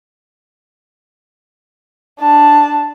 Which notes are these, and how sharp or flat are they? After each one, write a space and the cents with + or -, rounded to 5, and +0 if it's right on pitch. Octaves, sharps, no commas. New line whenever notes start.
D4 +0 A5 +0